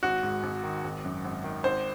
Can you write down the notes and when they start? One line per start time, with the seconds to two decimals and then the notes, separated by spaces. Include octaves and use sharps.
0.03 G#1 F#4
0.23 G#2
0.43 G#1
0.63 D#3
0.84 G#1
1.05 F#2
1.25 G#1
1.44 D#3
1.64 G#1 C5